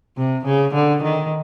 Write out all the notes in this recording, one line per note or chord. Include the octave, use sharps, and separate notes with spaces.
C3
C#3
D3
D#3